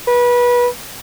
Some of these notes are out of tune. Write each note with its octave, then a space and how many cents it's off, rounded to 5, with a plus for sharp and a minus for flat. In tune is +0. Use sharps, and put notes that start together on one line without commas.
B4 -25